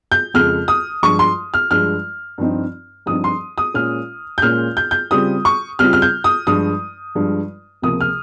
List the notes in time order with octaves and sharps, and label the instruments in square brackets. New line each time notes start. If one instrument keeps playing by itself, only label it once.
[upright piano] G6
F2 C#3 F3 G#3 F6
D#6
G2 F3 G#3 C#6
C6
F6
G2 F3 G#3 F6
G2 F3 C4 D#4
G2 F3 C4 D#4 D#6
C6
D#6
A#2 G#3 C#4 F4 F6
G6
A#2 G#3 C#4 F4 F6
G6
G6
C#3 G3 C4 F4 D#6
C#6
C#3 G3 C4 F4 F6
F6
G6
D#6
G2 F3 G#3 D#6
G2 F3 G#3
C#2 C3 F3 A#3 D#6
F6